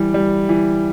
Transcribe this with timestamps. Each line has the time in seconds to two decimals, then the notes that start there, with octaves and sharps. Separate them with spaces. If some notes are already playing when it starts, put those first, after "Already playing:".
Already playing: E3 G3
0.14 G3
0.49 E3